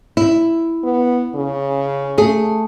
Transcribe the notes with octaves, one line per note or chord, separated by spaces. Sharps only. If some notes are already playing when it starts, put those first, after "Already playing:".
E4
B3
C#3
A3 G#4